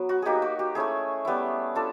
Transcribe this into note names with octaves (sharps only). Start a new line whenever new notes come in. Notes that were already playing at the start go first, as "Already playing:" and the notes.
Already playing: F#3 B3
F#4
A#3 D#4 G4 G#4
F#4
G4
A3 C#4 E4 G#4
G3 B3 E4
D4 F4 A4